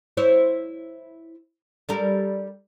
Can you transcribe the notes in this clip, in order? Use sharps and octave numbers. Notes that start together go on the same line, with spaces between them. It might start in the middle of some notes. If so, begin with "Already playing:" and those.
E4 C5 C#5
G3 A4 A#4